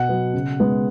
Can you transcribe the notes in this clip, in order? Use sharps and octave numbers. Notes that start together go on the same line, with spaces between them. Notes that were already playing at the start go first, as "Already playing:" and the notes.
Already playing: B2 F#5
F#3 B3
C#3
G#3 B3